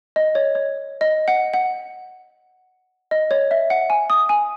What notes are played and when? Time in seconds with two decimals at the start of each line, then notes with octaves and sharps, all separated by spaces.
0.16 D#5
0.35 C#5
0.55 C#5
1.01 D#5
1.28 F#5
1.54 F#5
3.11 D#5
3.31 C#5
3.51 E5
3.70 F#5
3.90 G#5
4.10 D#6
4.29 G#5